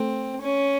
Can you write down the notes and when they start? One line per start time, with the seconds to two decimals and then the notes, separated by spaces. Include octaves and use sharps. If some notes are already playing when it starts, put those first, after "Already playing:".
Already playing: A3 C4 A4
0.42 C#4